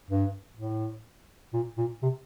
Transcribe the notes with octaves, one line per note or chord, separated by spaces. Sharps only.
G2
A2
A#2
A#2
C3